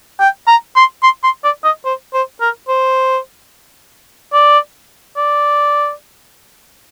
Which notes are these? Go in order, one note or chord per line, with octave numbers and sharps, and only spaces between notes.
G5
A#5
C6
C6
C6
D5
D#5
C5
C5
A#4
C5
D5
D5